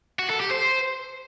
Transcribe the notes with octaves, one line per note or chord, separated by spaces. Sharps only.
F#4
A4
G4
C5